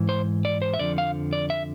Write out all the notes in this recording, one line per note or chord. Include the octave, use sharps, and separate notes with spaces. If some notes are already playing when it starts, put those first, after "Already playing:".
Already playing: G#2 E3
C5
D5
C5
E5
F2 D3 F3 D5
F5
D5
E5